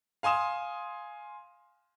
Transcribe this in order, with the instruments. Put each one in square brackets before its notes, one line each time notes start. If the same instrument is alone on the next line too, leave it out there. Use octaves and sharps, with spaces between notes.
[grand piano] F5 G#5 C6 D#6 E7